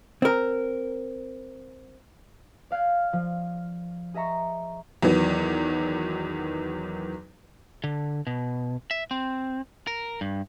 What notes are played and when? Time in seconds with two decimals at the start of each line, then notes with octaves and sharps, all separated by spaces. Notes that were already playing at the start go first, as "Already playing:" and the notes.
0.22 C4 A#4
2.71 D5 F5 F#6 G#6
3.13 F3
4.14 G#4 D#5 E5 A#5 C#6
5.02 E2 D#3 E3 F#3
7.84 D3
8.27 B2
8.91 E5
9.11 C4
9.87 A#4
10.21 G2